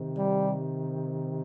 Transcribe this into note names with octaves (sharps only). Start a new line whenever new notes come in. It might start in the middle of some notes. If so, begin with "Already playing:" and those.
Already playing: C3 D#3
G3